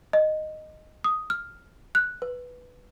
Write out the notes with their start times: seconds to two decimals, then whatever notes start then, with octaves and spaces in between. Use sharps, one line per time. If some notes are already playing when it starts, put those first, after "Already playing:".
0.13 D#5
1.04 D#6
1.30 F6
1.95 F#6
2.22 B4